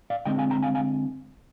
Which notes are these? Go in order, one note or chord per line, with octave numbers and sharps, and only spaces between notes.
D5 F5
D3 G#3 C4 D#5 G5
F5 G#5
G5 A#5
F5 G#5
F5 G#5